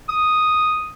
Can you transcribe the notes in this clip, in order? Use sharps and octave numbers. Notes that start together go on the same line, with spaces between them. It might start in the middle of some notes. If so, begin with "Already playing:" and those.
D#6